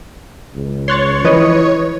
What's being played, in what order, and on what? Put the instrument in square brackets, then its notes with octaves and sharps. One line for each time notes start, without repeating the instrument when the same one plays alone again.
[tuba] C#2
[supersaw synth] C#5 [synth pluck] C6 F#6 A6
[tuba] E3 [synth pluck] F3 B4 D#5